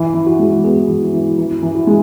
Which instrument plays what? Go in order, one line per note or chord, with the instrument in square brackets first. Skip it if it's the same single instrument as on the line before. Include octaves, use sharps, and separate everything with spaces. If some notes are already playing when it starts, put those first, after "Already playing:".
Already playing: [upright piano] E3 [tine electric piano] E4
[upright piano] E3
[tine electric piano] F#4
[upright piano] G#3
[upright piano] B3 [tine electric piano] G#4
[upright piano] E3
E3
[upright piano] E3 [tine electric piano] E4
[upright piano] E3
[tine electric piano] F#4
[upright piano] G#3